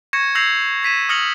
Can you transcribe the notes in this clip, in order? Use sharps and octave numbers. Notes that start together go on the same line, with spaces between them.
C#6 G#6 A#6 C#7 E7
E6 G6 G#6 A#6 C7 F7
G#6 B6 D#7 E7
D#6 F6 A#6 C#7 F#7